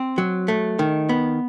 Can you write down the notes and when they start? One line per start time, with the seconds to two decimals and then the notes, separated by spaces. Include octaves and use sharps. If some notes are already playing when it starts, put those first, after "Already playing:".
Already playing: C4
0.18 F#3
0.48 A3
0.79 D#3
1.09 B3